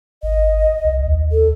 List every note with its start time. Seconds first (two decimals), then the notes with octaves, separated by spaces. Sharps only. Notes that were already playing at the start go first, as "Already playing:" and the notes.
0.23 G#1 D#5
0.84 C2
1.03 D#2
1.32 A4